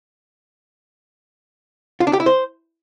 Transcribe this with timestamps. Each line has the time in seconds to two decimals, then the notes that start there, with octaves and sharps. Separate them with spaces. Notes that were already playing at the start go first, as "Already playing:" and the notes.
2.00 F4
2.07 D4
2.13 G4
2.20 E4
2.26 C5